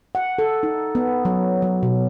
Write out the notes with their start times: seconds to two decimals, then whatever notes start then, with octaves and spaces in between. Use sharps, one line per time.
0.15 F#5
0.39 A4
0.63 D#4
0.95 B3
1.25 F#3
1.62 F#3
1.83 B2